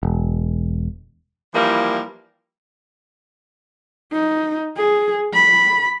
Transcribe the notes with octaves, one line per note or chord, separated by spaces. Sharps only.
E1
E3 F3 G3 A#3 E4
D#4
G#4
B5